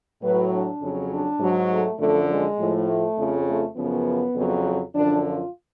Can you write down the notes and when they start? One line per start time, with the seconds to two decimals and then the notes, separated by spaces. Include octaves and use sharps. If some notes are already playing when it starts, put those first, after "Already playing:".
0.22 A2 F#3 B4
0.51 D4
0.81 F2 C#3 F#3
1.11 D4
1.40 G#2 F#3
1.70 A3
1.99 F#2 D3 F3 A3
2.29 G#3
2.59 A2 F3
2.88 A3
3.17 F2 C#3 F3
3.47 A3
3.76 F#2 C#3 F3 B3
4.35 F2 C#3 F#3
4.95 F#2 D3 F3 D4
5.25 F4